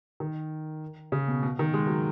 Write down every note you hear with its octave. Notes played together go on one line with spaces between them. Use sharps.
D#3
C#3
B2
B2
D#3
G#3
F#3